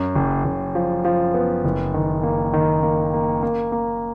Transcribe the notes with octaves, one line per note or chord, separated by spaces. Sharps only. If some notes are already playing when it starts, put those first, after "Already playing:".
Already playing: F#2
F#1
F#1
F3
F3
B3
F#1
D#3
A#3
D#3
A#3
A#3
A#3
A#3